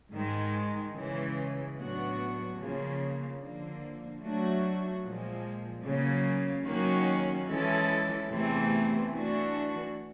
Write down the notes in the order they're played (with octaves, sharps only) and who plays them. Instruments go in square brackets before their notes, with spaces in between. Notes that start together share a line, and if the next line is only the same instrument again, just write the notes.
[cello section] G#2 D#3 G#3
C#3 E3 G#3
A2 F#3 B3 D4 F#4
C#3 F3 A#3
D3 F3 A#3
F#3 A3 D4 F#4
A#2 F3 G#3
C#3 F#3 A#3
D#3 F#3 A#3 C#4 F#4
E3 G#3 C#4 E4 A4
E2 C3 E3 A3 C4
E3 A3 D4 F#4